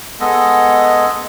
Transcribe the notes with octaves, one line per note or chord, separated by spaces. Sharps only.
G#3 B3 A4 D#5